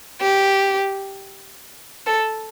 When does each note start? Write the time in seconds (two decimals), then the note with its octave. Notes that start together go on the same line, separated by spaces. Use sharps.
0.21 G4
2.07 A4